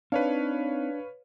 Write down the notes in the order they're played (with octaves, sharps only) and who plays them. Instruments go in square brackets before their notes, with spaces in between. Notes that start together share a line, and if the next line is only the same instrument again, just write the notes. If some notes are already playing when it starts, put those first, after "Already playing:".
[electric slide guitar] C4 D#4 [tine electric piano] D4 [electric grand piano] B4 C#5 F5